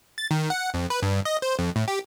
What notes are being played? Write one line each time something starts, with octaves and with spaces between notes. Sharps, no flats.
A6
D#3
F#5
F2
B4
G2
D#5
C5
F2
A2
G4